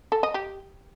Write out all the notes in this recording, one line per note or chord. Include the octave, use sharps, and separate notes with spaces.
A4
D#5
G4